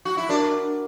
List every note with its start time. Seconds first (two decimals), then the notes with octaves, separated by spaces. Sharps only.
0.05 F#4
0.17 E4
0.29 D4 F#4 A#4